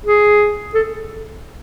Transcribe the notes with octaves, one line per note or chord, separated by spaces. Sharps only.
G#4
A4